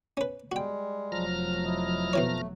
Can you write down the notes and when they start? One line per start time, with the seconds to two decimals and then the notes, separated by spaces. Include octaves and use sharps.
0.17 C#4 B4
0.52 G3 G#3 F#4 G5
1.12 F1 F3 F#3 A#5 F6
1.65 E4 D#5
2.13 B2 E3 A3 C#5